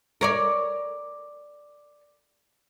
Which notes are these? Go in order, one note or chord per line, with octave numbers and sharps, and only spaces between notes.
A#4 C#5 D5